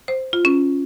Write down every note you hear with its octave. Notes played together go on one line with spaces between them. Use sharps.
C5
F4
C#4